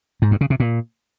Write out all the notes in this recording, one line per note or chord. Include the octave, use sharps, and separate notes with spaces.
G#2
G2
C#3
C3
A#2